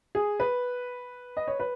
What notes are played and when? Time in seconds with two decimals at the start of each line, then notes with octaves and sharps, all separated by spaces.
0.15 G#4
0.40 B4
1.37 D#5
1.48 C#5
1.60 B4